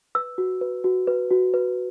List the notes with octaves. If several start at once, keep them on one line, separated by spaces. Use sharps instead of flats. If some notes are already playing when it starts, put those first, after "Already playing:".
B4 E6
F#4
B4
F#4
B4
F#4
B4